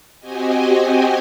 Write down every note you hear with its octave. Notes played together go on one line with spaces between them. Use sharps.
C4 F#4 G4 D#5 G#5